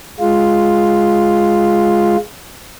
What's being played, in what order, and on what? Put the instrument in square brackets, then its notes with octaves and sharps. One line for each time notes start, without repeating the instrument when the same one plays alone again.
[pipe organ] G#3 F4